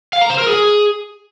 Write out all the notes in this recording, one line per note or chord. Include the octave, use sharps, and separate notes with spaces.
F5
A#5
C5
A#4
G#4